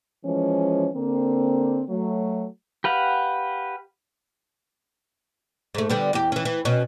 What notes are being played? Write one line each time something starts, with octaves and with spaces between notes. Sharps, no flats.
E3 F3 G#3 C#4
D3 A#3 C4
F#3 A3
G4 B4 F5 F#5
G#2 A3
D3 G3 B3
E2 G4
E3 C#4
E3
B2 C#4